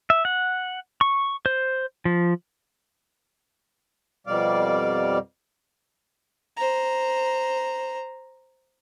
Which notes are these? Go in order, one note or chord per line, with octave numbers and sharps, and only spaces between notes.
E5
F#5
C#6
C5
F3
F2 B2 G3 D5 F5
C5 A#5